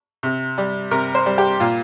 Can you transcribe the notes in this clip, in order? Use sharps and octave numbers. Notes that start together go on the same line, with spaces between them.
C3
G3
C3 A#4
C5
G3
G4
A#2 F4